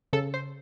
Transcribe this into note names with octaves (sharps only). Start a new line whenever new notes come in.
C#3 A4
C5